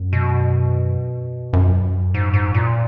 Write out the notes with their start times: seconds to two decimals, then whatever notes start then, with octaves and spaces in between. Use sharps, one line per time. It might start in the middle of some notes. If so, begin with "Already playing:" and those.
Already playing: F#2
0.13 B2
1.53 F#2
2.14 G#2
2.34 G#2
2.54 A#2